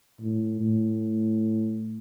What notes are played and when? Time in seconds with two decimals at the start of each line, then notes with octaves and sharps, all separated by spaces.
0.21 A2
0.61 A2